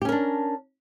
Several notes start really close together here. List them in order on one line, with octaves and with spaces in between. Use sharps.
G4 C#4 A#4 D4